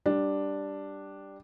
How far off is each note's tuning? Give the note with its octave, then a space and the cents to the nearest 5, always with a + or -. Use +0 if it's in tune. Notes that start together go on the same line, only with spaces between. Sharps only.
G3 +0 D4 +0